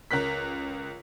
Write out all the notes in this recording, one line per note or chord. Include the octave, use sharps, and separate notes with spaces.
C#2 A#4 F#6 B6